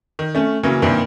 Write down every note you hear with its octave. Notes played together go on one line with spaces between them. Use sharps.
D#3
A3 C#4
C#3 E3 F#3 A#3 C#4
G2 C3 D#3 E3 A#3 C4